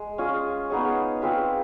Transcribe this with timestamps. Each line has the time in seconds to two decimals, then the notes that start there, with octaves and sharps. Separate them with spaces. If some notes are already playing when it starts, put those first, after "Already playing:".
Already playing: G#3
0.18 C#4 F4 G#4
0.70 B3 D#4 G#4 C#5
1.22 C4 F4 G#4 B4